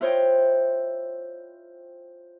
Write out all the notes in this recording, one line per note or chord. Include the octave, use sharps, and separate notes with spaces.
E4 F4 C5 C#5 D#5 G5